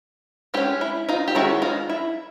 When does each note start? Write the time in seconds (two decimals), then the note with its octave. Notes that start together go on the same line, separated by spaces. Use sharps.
0.54 G#3 F4 G4
0.57 C#4
0.81 E4
1.09 D#4 F4
1.28 G4
1.35 D#3 G#3 C#4 E4 F#4
1.62 D#4 F4
1.90 E4